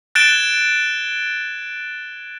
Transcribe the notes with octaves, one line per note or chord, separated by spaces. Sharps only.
F#6 G#6 A6 D7 E7 G7